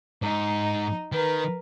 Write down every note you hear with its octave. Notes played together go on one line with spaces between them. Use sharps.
G#2 D#4
D#3 A#4 B4